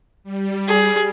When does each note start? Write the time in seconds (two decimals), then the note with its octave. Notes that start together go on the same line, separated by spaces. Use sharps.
0.24 G3
0.68 G#4